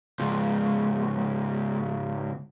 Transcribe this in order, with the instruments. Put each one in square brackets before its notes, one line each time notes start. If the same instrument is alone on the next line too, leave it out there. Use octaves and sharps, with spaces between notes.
[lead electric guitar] C#2 G#2